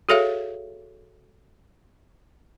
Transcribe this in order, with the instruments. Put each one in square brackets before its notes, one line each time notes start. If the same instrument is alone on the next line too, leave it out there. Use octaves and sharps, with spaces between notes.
[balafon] F#4 G#4 A4 C#5 E5 F5